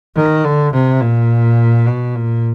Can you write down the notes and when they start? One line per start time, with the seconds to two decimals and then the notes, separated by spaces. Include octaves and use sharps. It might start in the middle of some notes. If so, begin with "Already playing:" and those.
0.16 D#3
0.44 D3
0.73 C3
1.01 A#2
1.86 B2
2.15 A#2